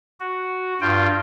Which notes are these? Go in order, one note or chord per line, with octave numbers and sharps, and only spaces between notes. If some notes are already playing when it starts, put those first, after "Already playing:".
F#4
G2 F4 G5